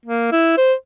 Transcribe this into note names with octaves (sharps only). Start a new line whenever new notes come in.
A#3
E4
C5